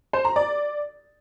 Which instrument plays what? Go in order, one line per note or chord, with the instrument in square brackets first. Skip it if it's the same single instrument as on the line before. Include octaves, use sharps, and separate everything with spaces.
[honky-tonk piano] C5
A#5
D5